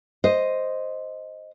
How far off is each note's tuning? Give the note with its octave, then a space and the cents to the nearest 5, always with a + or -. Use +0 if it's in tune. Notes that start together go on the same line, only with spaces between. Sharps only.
C5 +0 D#5 +0